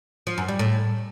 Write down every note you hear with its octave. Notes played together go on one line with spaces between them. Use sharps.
F3
F#2
G3
A2